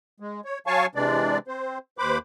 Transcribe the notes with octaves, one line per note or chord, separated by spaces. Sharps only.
G#3
C#5
F#3 C#5 F5 G#5 A5 C#6
C3 E3 G#3 D4 D5
C4 C5
D#2 B4 C5 B5 D6